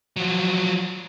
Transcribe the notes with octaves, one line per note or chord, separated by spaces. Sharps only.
F3 F#3